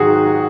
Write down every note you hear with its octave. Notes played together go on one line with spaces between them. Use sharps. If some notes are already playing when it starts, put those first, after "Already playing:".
Already playing: G#2 D#3 F#3 F#4 G#4